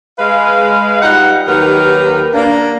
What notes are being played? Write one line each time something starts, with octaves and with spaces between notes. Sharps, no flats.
G#3 B4 F5
G3 D#4 F4 F#5
D#2 D#3 F#3 G4 A#4 B4
A#3 D4